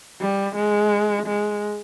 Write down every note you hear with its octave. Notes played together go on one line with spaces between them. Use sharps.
G3
G#3
G#3